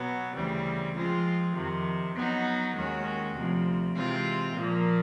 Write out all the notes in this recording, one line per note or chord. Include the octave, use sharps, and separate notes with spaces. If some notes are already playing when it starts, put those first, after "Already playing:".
Already playing: B2 F#3 B3
D2 C#3 E3 G3 C4
F3 G#3 C4 F4
F2 C3 D#3
F#3 B3 D#4 F#4
D#2 D#3 G#3 C#4 F#4
D2 C3 F3
C3 E3 G#3 C4 F4
A#2 F3 A#3